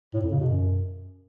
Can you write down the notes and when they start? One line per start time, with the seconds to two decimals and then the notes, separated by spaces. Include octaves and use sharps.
0.14 A2
0.22 F2
0.31 C#3
0.40 B2
0.48 F#2